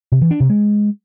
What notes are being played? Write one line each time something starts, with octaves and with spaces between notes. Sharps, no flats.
C3
E3
D4
C3
G#3